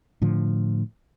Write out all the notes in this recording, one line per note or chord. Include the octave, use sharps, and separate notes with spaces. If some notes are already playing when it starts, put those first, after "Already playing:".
A2 D3 F3